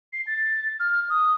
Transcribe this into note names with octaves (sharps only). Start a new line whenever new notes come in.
C7
A6
F6
D#6